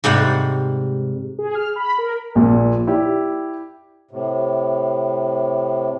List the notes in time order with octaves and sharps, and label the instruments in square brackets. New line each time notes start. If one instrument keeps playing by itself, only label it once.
[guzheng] G#2 C3 G3 F#5
[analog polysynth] G#4
F6
B5
A#4
[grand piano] A#1 A#2
E4 G4 D5
[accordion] A2 C3